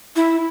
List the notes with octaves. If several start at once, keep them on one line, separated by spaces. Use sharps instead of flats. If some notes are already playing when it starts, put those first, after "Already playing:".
E4